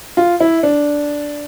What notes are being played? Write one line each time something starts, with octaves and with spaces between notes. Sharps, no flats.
F4
E4
D4